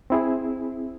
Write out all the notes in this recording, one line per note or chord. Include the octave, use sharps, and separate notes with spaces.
C4 E4 G#4